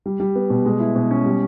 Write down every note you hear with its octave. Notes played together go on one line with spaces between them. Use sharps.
G3
G3
B3
B2
G#3
E4
B2
C#4
G3